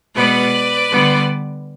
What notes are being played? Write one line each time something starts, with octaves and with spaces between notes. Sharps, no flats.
B2 G#3 B3 B4 D5
D3 G3 B3